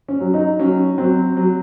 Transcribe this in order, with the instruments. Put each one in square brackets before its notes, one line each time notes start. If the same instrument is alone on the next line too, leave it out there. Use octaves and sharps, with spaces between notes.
[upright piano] C#4
F#3
D#4
F#3 C#4
F#3 C4
F#3